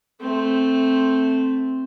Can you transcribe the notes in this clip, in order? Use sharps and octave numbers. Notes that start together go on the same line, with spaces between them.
A3 C4